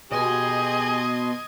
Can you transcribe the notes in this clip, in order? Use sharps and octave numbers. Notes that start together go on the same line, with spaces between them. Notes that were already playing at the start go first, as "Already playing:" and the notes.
B2 G4 G#4 D#5 C6 G#6